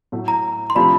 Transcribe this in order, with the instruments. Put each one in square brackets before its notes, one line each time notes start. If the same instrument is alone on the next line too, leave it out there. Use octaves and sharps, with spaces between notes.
[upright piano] A2 F#3 A3
[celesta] A#5
C6
[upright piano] C3 F3 A3 D4 [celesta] B5